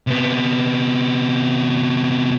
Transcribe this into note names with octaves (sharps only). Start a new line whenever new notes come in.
C3 B3